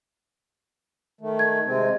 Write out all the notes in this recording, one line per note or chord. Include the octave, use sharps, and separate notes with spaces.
D#3 A3
G#6
C3 G#3 C4